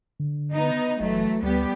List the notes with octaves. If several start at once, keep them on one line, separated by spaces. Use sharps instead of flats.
D3
B3 D#4
F#1 E3 F#3 A3
D2 G3 B3 G4